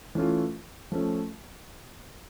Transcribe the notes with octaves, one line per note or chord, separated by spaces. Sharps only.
E3 A3 C#4 F4
F3 A3 C#4